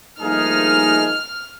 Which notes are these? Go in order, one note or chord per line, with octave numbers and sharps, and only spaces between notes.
G2 F3 A3 A#3 D#4 G#4 F6